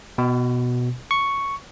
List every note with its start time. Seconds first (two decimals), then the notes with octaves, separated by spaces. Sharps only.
0.18 B2
1.11 C#6